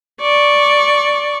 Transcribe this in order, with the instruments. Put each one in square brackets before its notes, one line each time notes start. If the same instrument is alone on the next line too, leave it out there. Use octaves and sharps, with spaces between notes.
[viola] D5 C#6